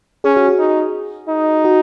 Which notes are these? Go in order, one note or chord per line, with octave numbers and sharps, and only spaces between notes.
C#4 G#4
F#4
G#4
D#4
D#4
F#4